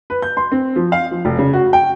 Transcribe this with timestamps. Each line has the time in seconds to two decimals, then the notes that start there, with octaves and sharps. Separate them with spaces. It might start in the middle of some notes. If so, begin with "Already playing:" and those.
0.10 B4
0.22 G6
0.37 C6
0.52 C4
0.76 F3
0.92 F5
1.11 F3
1.25 F1
1.39 C#3
1.53 F#4
1.73 G5